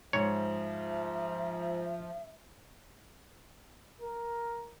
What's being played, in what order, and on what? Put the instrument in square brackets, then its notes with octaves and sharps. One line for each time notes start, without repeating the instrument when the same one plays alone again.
[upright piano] G#2 [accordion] F3 [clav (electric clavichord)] C#5 [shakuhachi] E5
[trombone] A#4